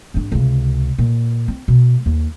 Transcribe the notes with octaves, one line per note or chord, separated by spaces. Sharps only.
G#1 D4
C#2 C3
A#2
C4
B2
D#2